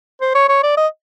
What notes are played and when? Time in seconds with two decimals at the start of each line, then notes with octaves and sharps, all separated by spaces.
0.21 C5
0.35 C#5
0.49 C#5
0.63 D5
0.77 D#5